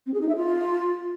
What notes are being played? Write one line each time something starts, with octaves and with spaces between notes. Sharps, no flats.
C4
G#4
D#4
E5
F4